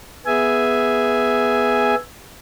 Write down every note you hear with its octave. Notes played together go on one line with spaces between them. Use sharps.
B3 G#4 E5 G#5